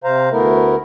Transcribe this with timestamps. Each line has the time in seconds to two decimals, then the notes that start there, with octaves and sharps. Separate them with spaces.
0.04 C3 C5 F5 A#5
0.32 D2 A3 B3 E4 A#4